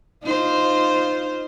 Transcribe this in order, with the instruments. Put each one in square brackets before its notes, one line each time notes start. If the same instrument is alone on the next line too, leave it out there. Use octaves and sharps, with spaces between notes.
[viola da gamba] D#4 F4 C5